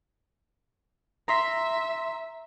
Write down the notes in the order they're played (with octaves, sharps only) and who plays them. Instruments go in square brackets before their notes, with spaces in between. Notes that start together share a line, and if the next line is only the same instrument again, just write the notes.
[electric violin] E5 [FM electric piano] A#5 C6 B6